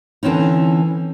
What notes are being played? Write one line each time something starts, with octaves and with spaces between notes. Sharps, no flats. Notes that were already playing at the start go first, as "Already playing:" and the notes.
D3 E3 C4 C#4 D#4